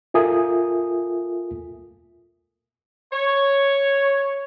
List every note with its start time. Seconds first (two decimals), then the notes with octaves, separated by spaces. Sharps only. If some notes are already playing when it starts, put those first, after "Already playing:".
0.14 F4 A4 A#4 E5 G#5 D#6
3.13 C#5